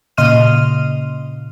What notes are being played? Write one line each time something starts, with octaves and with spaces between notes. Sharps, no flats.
A#2 C#3 D#5 C6 F6 D#7